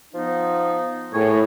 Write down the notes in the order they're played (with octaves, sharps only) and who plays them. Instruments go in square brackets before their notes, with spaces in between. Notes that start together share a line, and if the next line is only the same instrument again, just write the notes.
[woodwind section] F3 B3 D#4
[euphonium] A2 [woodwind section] G#4 A#4 C#5